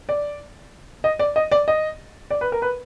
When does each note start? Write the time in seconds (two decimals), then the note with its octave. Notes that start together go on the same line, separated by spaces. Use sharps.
0.09 D5
1.04 D#5
1.19 D5
1.36 D#5
1.52 D5
1.68 D#5
2.31 D5
2.41 B4
2.52 A#4
2.62 B4